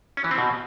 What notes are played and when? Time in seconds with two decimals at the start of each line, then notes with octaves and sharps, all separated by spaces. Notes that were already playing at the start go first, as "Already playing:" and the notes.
0.17 C#4
0.24 E3
0.31 C4
0.38 B2